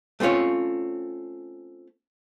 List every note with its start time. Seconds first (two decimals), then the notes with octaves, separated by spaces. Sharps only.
0.20 A3 C4 C#4 F4 C#5